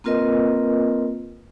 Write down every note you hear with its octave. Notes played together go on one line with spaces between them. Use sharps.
A#3 C4 F4 A#4 B4 D#5